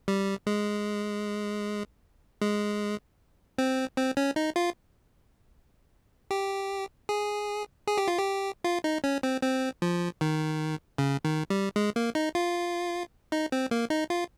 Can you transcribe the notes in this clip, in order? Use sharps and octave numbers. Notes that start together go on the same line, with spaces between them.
G3
G#3
G#3
C4
C4
C#4
D#4
F4
G4
G#4
G#4
G4
F4
G4
F4
D#4
C#4
C4
C4
F3
D#3
C#3
D#3
G3
G#3
A#3
D#4
F4
D#4
C4
A#3
D#4
F4